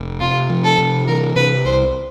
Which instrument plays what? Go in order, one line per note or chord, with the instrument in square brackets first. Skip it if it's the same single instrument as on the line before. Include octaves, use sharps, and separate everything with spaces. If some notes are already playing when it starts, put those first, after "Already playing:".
Already playing: [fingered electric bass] F1
[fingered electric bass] C3 [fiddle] F4
[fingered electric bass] F3
[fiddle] A4
[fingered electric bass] C3
[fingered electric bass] E3 [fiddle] A#4
[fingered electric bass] C3 [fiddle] B4
[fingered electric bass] C2 [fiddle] C5